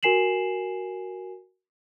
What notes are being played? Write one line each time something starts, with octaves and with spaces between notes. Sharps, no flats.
F#4 A#4 G#5 C7 E7 F#7